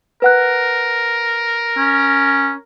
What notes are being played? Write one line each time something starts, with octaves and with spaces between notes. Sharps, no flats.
A#4 B4 F#5 F#6
C#4